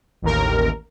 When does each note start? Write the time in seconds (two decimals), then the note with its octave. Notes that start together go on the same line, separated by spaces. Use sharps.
0.22 A1 D#2 A#4